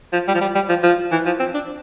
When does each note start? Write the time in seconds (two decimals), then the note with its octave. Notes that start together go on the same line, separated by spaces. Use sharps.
0.13 F3
0.27 G3
0.34 F3
0.41 G3
0.55 G3
0.69 F3
0.83 F3
1.12 E3
1.26 F3
1.39 C4
1.54 D4